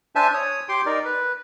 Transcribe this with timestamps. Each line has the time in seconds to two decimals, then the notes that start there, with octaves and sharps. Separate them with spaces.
0.15 D4 C5 E5 G#5 A5
0.34 C#5 D#6
0.69 G4 G5 C6
0.86 D#4 A#4 D5
1.05 B4